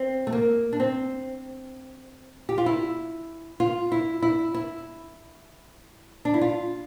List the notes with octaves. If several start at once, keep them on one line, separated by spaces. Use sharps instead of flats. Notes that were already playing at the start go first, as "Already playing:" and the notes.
Already playing: C4
A3
A#3
D4
C4
G4
F4
E4
F4
E4
E4
E4
D4
E4
F4